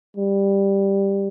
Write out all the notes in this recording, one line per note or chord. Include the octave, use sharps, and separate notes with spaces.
G3